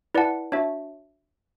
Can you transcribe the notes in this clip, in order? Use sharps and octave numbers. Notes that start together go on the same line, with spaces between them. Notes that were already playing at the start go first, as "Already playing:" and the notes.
E4 B4 D5 F#5 A5
D4 F#4 C#5 E5 A5